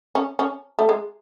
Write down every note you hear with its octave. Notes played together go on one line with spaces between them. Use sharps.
C#4
C#4
A3
G#3